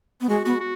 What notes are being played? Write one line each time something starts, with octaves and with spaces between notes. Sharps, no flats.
B3
G#3 F#4
B3 F#4
F#4